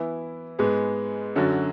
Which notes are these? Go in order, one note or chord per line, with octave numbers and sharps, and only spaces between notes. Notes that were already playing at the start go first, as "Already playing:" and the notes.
Already playing: E3 B3 E4
G#2 G#3 B3
F#2 D3 F#3